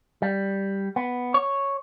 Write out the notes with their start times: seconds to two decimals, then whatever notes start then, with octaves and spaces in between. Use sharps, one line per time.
0.22 G3
0.96 B3
1.34 C#5